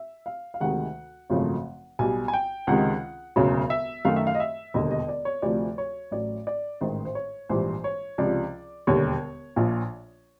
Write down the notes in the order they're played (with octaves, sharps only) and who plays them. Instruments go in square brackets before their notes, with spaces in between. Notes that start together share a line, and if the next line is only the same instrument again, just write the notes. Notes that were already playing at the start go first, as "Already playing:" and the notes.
Already playing: [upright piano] E5
F5
F5
D2 C3 D#3 G#3 F#5
G#1 F#2 C#3 F3 A3
B1 B2 G3 G#5
G#5
G5
C#2 C3 D#3 G#3 F#5
E1 D2 C#3 F#3
E5
F#2 D#3 F#3 A3 F5
E5
F5
D#5
E5
E1 D#2 D3 G3 D#5
D#5
D5
C#5
D2 C3 F3 A3 D5
C#5
A1 A2 F#3 D5
D5
A1 G#2 D#3 C5
C5
C#5
A#1 G#2 E3 G3 C5
C#5
C#2 C3 F3 D5
E1 D#2 D3 G3 C#5
A#1 A#2 F3